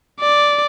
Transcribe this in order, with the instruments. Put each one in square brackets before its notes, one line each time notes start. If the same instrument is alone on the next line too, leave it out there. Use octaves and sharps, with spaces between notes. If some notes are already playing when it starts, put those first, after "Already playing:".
[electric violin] D5